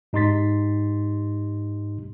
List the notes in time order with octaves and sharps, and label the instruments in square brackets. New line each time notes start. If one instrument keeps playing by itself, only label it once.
[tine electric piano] G#2 D#4 G4 C6 A6 B6